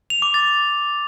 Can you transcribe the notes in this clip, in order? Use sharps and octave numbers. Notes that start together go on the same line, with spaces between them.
F7
D6
A6